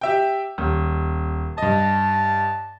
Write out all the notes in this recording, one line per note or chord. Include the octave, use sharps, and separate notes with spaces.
G4 E5 G5
D#1
G2 D#5 A5